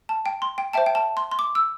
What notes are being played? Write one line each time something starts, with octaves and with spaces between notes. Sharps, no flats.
A5
G5
C6
G5
C5 E5 G5 A5
G5
A5
C6
C6
D6
E6